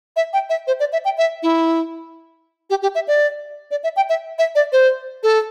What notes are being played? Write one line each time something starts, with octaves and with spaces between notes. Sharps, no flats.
E5
G5
E5
C5
D5
E5
G5
E5
E4
G4
G4
E5
D5
D5
E5
G5
E5
E5
D5
C5
A4